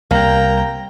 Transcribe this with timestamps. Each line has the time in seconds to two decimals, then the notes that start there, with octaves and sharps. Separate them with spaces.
0.11 C2 A#3 G5 A#5